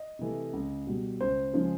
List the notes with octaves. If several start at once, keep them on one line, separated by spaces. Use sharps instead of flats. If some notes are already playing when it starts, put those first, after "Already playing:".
Already playing: D#5
C3 E3 A3
C#2
B2 G3
C#2 C5
C#3 F3 G#3